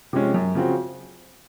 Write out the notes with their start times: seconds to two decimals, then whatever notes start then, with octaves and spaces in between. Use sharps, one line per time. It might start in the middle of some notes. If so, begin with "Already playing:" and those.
0.13 C3 F3 G#3 C#4
0.34 F#2
0.55 C#3 F3 C4 F#4